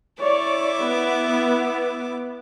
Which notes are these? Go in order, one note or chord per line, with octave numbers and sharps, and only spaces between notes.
E4 C#5 D5 E5 D6
B3